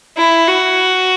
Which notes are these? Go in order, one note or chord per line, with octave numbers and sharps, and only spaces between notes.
E4
F#4